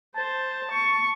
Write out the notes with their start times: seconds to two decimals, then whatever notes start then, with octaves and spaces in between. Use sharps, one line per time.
0.16 C5 A5
0.71 C#6